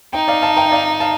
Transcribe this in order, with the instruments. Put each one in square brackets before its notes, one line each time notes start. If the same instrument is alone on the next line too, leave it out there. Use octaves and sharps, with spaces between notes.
[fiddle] D#4 [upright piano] G5 A#5
[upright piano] D5 F5
F5 A5
G5 A#5
D5 F5
F5 A5